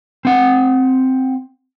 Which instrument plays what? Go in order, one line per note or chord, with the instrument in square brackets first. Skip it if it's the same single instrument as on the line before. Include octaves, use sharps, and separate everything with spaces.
[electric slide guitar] C4 F#5